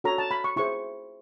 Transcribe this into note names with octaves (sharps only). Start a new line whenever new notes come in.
F#4 A4 C#5 A#5
A5
B5
C#6
E4 G#4 C5 C#6